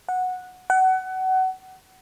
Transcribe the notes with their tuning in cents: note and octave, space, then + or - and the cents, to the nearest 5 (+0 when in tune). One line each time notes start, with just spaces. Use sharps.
F#5 -10
F#5 +25